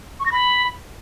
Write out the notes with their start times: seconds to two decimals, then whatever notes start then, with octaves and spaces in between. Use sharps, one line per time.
0.20 C#6
0.26 A#6
0.32 B5